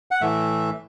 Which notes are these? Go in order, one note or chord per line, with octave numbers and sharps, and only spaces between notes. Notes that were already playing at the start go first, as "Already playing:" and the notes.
F#5
A2 E3 A3 E5